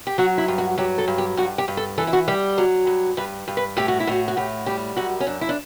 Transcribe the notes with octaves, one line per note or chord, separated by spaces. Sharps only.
G4
F#3 F#4
E4
G2
F#4
F#3 G4
A4
G2
G4
G2 F#4
G4
G2
A4
E3 A4
E4
F#4
G3 G4
F#3
G2
G2 B4
G2
B4
A2 G4
F#4
E4
A2 F#4
F#4
A2 G4
G3 G4
F#2 F#4
C#4
F#2 D4
E4
D4